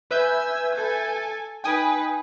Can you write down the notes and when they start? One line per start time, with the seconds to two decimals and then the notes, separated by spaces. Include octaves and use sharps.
0.11 B4 E5 G#5 E6 G6
0.74 A4 G#5
1.64 D#4 B4 G5 G#5 D#6